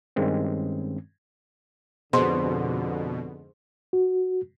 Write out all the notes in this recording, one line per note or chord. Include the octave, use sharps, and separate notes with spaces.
G2 D#3 G#3 C4 C#4
F2 G#2 B2 D3 G#4 C5 C6
F#4